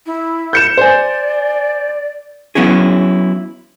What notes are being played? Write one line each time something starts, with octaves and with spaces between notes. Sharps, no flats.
E4
G6 C#7 E7
C5 D5 G#5
F#3 B3 C#4 E4 G#4